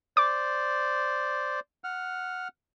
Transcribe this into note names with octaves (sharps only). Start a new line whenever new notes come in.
C5 D5 D6
F#5 F6